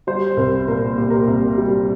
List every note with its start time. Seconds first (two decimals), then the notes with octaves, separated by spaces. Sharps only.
0.07 G3 C5
0.37 C2 A#4
0.67 A#2 A#4
0.97 A#2 G4
1.10 A#4
1.23 C2 G4
1.57 G3